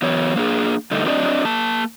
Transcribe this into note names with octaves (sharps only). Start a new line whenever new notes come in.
E3 F#3 B3 C#5
A#3 D4 G#4
G2 D3 A3 D#4
F#3 C4 D4 A#4 D5 D#5
A#3 A5